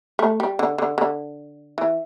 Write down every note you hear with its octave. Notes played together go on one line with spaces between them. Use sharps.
A3
G3
D3
D3
D3
E3